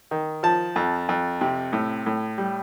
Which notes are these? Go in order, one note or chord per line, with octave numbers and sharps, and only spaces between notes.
D#3
F3 A5
F2
F2
C3
A2
A2
G3